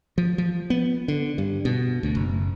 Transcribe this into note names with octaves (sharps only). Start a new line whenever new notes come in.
F3
F3
B3
D3
G2
B2
D2
F#1